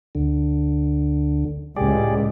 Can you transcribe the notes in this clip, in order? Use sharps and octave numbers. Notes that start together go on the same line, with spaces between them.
D2 D3
C#2 A2 G4 G#4 D5